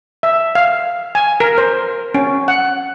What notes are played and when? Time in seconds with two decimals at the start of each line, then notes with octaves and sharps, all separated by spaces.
0.23 E5
0.55 F5
1.15 G#5
1.40 A#4
1.58 C5
2.14 C#4
2.48 F#5